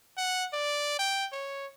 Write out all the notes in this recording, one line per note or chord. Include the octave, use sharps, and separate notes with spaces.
F#5
D5
G5
C#5